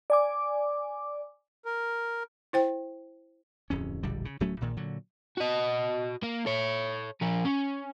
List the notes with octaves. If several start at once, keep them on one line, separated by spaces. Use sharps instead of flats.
D5 G#5 D6
A#4
E4 C5 G5
D1 F2 C#4
E1 A#1 D3 G3
C#3
D1 F#3 A3 C#4
A#1 A#2 D#3
A#2 D3 F#3
F#4 D#5
A#3
A4 C#5
F3 A#4
C#4